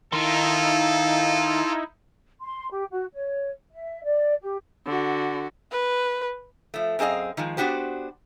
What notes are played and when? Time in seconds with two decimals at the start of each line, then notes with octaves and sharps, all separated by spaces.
0.13 D#3 D#4 E4 A4 F5 C6
2.41 C6
2.71 G4
2.91 F#4
3.13 C#5
3.72 E5
4.03 D5
4.42 G4
4.86 D3 F#4
5.72 B4
6.74 F3 A3
6.99 F#2 C4 G#4 D#5 F5
7.37 D#3 F3 G#3
7.57 B3 D4 F#4 G4 C5